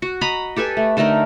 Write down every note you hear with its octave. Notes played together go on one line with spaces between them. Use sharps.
F#4
D#5 A#5 B5
G4 A4 B4 G#5
A3
D3 A3 D#4 A#4